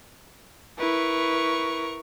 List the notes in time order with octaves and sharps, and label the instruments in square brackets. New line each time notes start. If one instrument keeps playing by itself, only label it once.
[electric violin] E4 B4 [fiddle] A#4 C#6